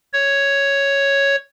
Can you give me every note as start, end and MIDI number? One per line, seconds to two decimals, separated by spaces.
0.13 1.36 73